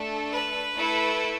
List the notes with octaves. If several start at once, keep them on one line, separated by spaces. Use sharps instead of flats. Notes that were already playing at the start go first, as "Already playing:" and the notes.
Already playing: A3 D4 A4
B4
A3 E4 A4